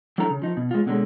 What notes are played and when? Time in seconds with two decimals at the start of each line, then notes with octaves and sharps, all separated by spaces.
0.18 F#3 D4 E4 A4 A#5
0.30 C#3
0.42 F3 D#4
0.57 B2
0.71 G#3 F4
0.86 B2 D3 F#3 G#3